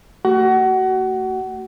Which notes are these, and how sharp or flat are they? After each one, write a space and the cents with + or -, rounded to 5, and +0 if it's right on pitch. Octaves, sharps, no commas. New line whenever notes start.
A3 +45 F#4 +30 F#5 +25